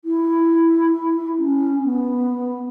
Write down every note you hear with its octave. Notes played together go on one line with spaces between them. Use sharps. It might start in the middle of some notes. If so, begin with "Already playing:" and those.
E4
C#4
B3